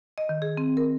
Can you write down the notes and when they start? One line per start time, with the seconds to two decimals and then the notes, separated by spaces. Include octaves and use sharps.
0.18 D#5
0.29 D#3
0.42 G#4
0.57 C4
0.77 A#4